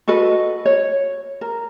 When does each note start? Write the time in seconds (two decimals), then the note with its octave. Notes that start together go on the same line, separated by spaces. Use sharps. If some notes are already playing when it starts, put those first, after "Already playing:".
0.08 F#4 A4 B4 D#5
0.66 C#5
1.41 A#4